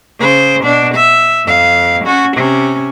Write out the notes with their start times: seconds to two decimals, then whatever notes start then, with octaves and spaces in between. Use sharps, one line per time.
0.20 C#3 C5
0.63 B2 D4
0.94 E5
1.45 F2 F5
2.04 C#4 F#4
2.37 C3 C#4